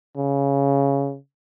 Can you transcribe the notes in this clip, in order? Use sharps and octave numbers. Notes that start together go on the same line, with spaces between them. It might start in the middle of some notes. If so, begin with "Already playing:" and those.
C#3